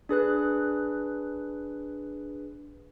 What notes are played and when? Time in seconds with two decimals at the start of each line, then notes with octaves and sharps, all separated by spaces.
0.09 D4 G#4 B4 F#6